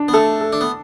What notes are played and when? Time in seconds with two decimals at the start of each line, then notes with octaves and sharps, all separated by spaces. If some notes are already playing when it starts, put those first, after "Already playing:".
Already playing: D4
0.08 B3
0.14 A3 A4
0.41 A4
0.53 D4
0.61 B3